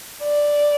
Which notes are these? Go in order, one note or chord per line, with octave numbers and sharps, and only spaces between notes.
D5